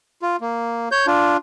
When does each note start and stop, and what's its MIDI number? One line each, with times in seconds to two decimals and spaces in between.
0.22 0.36 65
0.41 0.89 58
0.92 1.06 73
0.92 1.06 91
1.07 1.37 62
1.07 1.37 65